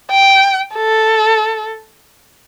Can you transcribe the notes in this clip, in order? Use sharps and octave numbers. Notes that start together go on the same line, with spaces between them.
G5
A4